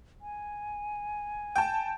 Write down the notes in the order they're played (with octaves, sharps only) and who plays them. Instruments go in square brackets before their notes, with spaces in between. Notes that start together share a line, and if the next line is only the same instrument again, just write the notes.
[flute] G#5
[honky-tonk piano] G5 A5